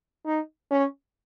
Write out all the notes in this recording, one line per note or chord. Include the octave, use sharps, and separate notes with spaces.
D#4
C#4